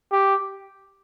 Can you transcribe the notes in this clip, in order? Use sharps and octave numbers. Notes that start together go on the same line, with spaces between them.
G4